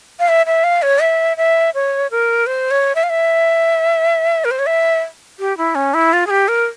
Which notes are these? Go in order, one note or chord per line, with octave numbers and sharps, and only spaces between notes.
F5
E5
E5
F5
C#5
E5
E5
C#5
A#4
C5
C#5
E5
F5
E5
A#4
C5
C#5
E5
G4
E4
C#4
E4
F4
G#4
G4
A#4